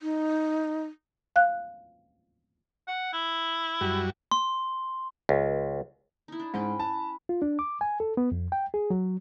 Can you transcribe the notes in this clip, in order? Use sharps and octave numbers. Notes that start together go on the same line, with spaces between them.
D#4
F5 F#6
F#5
E4
F#2 G3 F#4
C6
C#2
D#4 E4
D4
G#2 C#4 B4 G5
B4 A5
F4
D4
D6
G#5
A4
B3
F2
G5
G#4
F#3